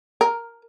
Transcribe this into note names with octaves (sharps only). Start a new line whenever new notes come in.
A#4